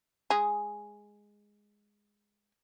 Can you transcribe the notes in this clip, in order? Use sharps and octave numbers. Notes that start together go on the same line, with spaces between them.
G#3 G#4